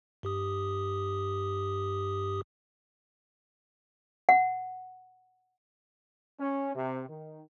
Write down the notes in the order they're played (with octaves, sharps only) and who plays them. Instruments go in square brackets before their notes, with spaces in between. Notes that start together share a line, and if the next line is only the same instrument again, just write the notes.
[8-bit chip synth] G2 G4 D#6
[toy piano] F#5
[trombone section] C#4
C3
D#3